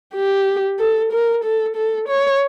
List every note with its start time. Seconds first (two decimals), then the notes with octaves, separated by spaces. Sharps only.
0.15 G4
0.79 A4
1.12 A#4
1.44 A4
1.76 A4
2.08 C#5